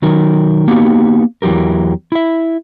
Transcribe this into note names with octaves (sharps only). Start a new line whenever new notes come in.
D#3 F#3 D#4 A#4
A#3 B3 D#4 F#4 G4
E2 E3 F#3 G4 A#4
E4 E5